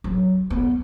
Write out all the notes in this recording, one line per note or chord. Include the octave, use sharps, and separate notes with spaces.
F#3
B3